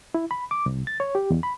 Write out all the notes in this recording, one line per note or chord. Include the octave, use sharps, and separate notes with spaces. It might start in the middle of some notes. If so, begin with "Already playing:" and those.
E4
B5
D6
C2
A6
C#5
G4
E2
B5